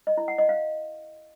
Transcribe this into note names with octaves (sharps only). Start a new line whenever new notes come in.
D#5
E4
F#5
D#5
F5